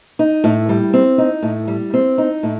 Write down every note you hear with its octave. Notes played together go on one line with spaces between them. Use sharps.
D#4
A2
G3
C4
D#4
A2
G3
C4
D#4
A2